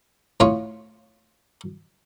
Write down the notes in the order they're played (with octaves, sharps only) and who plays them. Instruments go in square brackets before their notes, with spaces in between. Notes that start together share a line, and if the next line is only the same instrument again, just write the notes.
[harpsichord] A2 C#4 F4 C#5 C#6